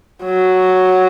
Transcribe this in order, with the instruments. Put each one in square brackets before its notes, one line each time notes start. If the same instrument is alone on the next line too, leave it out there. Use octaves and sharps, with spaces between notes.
[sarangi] F#3